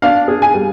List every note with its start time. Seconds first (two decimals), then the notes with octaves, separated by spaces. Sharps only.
0.02 D4 F5
0.28 G#4
0.42 G#5
0.54 G3